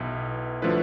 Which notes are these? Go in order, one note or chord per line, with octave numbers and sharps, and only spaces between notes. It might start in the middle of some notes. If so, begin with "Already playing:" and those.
Already playing: B1 B2 B3 E4
D3 F3 A3 E4 B4